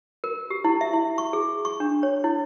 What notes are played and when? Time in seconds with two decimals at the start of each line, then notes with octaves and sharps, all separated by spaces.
0.24 A#4
0.50 G4
0.64 E4
0.81 E5
0.93 E4
1.18 C#6
1.33 G#4
1.65 C#6
1.80 D4
2.03 C#5
2.24 E4